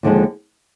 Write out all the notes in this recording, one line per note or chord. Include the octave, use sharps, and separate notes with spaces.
D#2 D3 F3 G#3